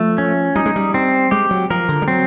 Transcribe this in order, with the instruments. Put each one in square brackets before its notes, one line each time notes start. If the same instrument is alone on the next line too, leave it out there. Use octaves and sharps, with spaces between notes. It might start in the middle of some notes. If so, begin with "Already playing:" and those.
Already playing: [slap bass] F3 [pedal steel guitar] A3
[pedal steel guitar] C#4
[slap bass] G3 [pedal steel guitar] D#4
[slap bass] G#3
G3
[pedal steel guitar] C4
[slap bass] G#3 [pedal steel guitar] G4
[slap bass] F#3
[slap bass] F3 [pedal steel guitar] A#4
[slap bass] D3
G3
[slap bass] F#3 [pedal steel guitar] C4